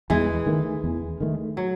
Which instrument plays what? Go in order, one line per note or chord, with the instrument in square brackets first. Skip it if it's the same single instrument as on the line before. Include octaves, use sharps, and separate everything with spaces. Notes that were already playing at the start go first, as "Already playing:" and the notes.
[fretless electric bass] E2 [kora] E3 G#3
[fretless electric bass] D#3 A3
E2
D#3 A3
[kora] F#3